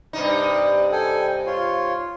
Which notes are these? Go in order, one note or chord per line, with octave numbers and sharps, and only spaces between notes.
G2 C3 D#4
A4 G5 G#5
F4 C#5 C6